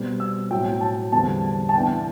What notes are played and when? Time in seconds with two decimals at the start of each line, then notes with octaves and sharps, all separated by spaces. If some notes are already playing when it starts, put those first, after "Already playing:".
Already playing: B2 G3 C4
0.20 E6
0.51 A2 F#3 C4 G5
0.66 G5
0.81 A5
1.12 E2 D3 G3 C4 A5
1.69 A5
1.74 C3 E3 B3 D4 G5